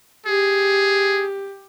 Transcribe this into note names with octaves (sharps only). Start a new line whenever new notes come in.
G4 G#4